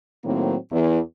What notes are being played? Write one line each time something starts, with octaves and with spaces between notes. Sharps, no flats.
A2 D#3 F#3 A#3 C4
E2